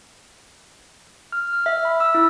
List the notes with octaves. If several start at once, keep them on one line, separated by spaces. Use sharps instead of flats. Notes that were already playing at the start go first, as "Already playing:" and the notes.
F6
F6
E5
B5
E6
E4